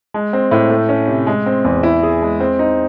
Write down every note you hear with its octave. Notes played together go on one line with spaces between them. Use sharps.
G#3
C4
A2
A3
C#4
C3
G#3
C4
E2
E4
G#4
G#3
C4
D#4